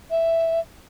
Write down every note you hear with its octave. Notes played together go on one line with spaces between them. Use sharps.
E5